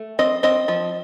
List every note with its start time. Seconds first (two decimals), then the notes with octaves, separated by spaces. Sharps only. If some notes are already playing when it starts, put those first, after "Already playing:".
Already playing: A3
0.19 C4 D#5
0.43 C4 D#5
0.68 F3